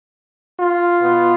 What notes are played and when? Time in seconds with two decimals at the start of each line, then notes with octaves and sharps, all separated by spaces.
0.59 F4
1.00 B2 B3